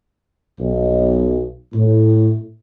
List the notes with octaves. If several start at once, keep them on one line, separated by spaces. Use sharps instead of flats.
B1
A2